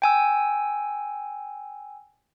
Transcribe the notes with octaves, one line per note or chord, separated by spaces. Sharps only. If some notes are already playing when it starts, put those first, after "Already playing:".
G5 G#5 E6